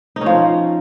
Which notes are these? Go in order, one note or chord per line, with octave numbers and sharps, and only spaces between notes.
D#4
C#4
F3